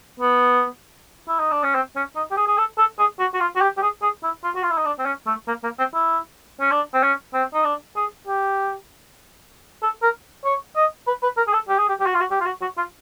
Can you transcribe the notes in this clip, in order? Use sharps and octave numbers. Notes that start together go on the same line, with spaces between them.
B3
E4
D#4
D4
C#4
C4
C#4
D#4
G4
G#4
G#4
A4
A4
G#4
F#4
F#4
F4
F#4
G4
G4
G#4
G#4
E4
F4
F#4
F4
E4
D#4
D4
C4
C#4
A3
A#3
A#3
C4
E4
C#4
D4
C4
C#4
C4
D#4
D4
G#4
G4
A4
A#4
C#5
D#5
B4
B4
A#4
G#4
A4
G4
G#4
G4
G4
F#4
F4
F#4
G4
F4
F#4
F#4
F4